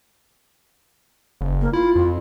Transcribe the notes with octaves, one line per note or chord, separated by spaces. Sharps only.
F#1
A#3
E4 F4
F2